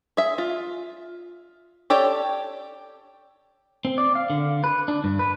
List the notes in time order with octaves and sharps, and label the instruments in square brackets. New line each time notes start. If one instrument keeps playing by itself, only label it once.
[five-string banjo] G#4 E5
F4
G4 A4 C#5 D5
[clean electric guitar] C4
D5
F5
D3
B4
D4
G2
B4